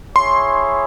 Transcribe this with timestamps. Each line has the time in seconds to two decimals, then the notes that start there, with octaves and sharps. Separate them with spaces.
0.14 E4 G#4 C#5 C6